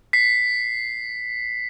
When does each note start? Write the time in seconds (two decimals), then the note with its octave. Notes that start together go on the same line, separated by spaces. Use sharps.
0.13 B6 C7